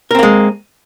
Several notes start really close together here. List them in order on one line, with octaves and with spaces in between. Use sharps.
A#4 C4 A#3 G#3